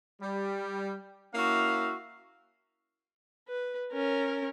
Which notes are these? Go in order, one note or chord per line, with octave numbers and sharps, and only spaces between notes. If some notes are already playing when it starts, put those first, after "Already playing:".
G3
A#3 C#4 E4 F#4 E5 F5
B4
C#4 A#4